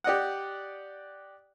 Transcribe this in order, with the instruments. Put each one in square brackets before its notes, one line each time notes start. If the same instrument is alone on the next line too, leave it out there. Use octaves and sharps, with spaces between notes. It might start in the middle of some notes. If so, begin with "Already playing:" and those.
[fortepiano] G4 D5 D#5 F#5